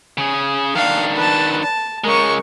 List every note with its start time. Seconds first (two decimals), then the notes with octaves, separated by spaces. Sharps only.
0.18 C#3 G#4
0.76 D#3 D4 F5
1.16 B4 A5
1.63 A5
2.04 C#3 G#3 A#4 C#6